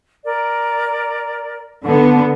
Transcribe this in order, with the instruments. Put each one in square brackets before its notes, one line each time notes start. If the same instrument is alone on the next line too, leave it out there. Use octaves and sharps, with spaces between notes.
[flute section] A#4 D5
[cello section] D3 B3